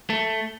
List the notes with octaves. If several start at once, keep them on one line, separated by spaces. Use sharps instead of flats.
A3